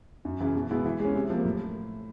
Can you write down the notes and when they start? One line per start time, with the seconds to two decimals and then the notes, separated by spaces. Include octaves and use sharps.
0.25 F#2
0.40 C#3 E3
0.55 B2
0.70 G#3 B3 E4
0.86 E3
1.00 G#3
1.05 C#4
1.15 C3
1.30 F3 A#3
1.45 A2